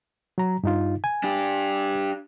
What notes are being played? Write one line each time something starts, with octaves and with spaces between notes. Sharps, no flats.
F#3 A#5
G2 D#4 F4
G#5
D4 G4